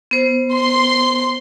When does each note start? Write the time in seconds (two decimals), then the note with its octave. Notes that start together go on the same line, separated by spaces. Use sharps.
0.11 B3 C5
0.54 C6